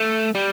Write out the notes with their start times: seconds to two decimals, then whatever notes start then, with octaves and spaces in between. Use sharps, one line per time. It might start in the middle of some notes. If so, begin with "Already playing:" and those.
Already playing: A3
0.35 G3